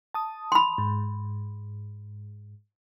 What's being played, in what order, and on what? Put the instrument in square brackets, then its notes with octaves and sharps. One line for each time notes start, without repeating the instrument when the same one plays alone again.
[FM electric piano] A5 D#6
[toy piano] B5 C6
[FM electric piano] G#2